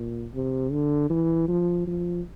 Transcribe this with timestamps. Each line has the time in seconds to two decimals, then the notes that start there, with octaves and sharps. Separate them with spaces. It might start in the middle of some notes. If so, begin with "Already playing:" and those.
Already playing: A#2
0.34 C3
0.72 D3
1.10 E3
1.48 F3
1.87 F3